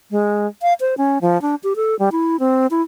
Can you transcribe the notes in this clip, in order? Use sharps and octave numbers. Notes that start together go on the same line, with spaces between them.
G#3
F5
C5
C#4
F3
D4
G4
A4
G3
E4
C4
E4